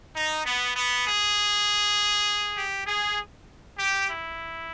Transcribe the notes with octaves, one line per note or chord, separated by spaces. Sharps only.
D#4
B3
B3
G#4
G4
G#4
G4
E4